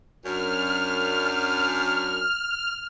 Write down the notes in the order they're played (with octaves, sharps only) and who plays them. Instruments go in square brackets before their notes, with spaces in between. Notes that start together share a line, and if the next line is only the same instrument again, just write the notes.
[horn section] F#2 D4 [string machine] F6